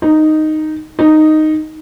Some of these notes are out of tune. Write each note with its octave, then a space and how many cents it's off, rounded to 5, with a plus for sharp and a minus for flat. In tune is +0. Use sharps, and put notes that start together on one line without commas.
D#4 -5
D#4 -5